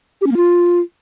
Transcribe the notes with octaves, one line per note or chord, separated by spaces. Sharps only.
G4
C#4
A#3
F4